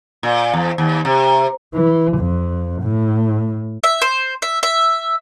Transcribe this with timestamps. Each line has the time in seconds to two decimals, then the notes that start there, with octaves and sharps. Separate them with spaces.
0.23 A#2
0.53 E2
0.78 D#2
1.05 C3
1.74 E3
2.18 F2
2.82 A2
3.84 E5
4.02 C5
4.42 E5
4.63 E5